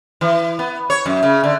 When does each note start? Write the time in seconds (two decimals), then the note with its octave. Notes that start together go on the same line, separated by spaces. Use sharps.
0.21 E3
0.59 B3
0.90 C#5
1.06 F#2
1.23 C#3
1.44 D3